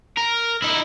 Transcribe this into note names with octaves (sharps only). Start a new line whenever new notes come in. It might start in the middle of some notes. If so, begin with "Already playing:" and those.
A#4
D#4 E4